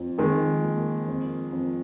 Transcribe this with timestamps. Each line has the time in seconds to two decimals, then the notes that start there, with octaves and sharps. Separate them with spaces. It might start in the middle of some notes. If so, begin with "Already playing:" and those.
Already playing: F2
0.18 F2 D#3 G#3
0.64 A#3
1.08 F2
1.52 F2